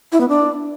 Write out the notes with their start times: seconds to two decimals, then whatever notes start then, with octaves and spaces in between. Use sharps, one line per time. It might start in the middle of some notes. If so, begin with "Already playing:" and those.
0.12 E4
0.21 B3
0.29 D4